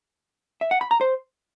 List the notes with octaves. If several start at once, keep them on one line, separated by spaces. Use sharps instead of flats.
E5
F#5
B5
A#5
C5